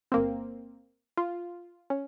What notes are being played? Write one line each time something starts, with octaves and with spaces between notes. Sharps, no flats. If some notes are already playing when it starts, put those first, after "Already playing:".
G1 A#3 C4
F4
C#4